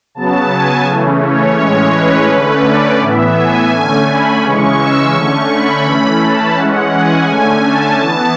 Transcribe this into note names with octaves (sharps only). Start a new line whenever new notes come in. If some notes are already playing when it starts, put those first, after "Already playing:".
C#3 F#3 B3 A5
G#5
C#3 E3 A3 C#4
C#5
A2 E3 G#3 C#4 C#5
B4
D3 A3 C#4 B4
D5
A2 E3 B3 E5
G#5
D3 A3 C#4
B5
C#3 E3 G#3 C#4 C#6
E6
D3 A3 C#4 C#6
B5
E3 A3 C#4
A5
E3 G#3 C#4 F#5
G#5
D3 A3 C#4 G#5
A5
E3 B3 A5